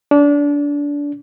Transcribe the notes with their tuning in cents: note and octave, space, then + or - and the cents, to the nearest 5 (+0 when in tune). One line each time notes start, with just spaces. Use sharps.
D4 -25